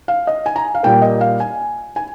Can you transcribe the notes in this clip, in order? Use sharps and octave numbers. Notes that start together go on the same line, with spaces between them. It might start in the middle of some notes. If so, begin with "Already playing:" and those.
F5
D#5
G#5
A#5
F5
A#2 G3 A#3 G5
D#5
F5
G#5
G#5